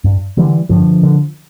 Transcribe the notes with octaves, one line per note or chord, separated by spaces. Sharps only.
G2
D3 E3 G3
G2 D3 F3
D3